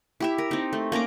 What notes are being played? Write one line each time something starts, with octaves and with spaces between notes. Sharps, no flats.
E4 G4 E5
A#4
C4 D#4
A3
A#3 C#4 A#5 D6